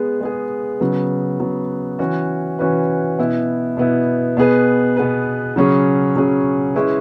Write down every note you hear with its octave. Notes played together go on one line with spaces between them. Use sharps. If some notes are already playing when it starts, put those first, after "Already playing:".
Already playing: G#3 B3 G#4
G#3 B3 G#4
C#3 F#3 B3
C#3 F#3 B3
E3 C#4 F#4 B4
E3 C#4 F#4 B4
B2 B3 E4
B2 B3 E4
B2 B3 G#4 B4
B2 B3 G#4 B4
C#3 F#3 C#4 G#4
C#3 F#3 C#4 G#4
G#3 C#4 E4 G#4 B4